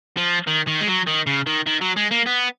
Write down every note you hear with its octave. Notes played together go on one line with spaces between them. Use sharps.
F3
D#3
D#3
G#3
F#3
D#3
C#3
D#3
D#3
F#3
G#3
A#3
B3